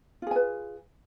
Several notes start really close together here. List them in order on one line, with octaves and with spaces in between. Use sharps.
F4 G#4 G#5 B4